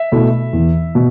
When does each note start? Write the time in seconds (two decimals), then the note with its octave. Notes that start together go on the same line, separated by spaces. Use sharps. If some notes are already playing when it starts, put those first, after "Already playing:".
Already playing: E5
0.12 B2 A3 E4
0.53 E2
0.95 B2